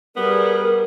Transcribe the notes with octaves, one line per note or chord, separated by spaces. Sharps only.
G3 B3 G#4 A#4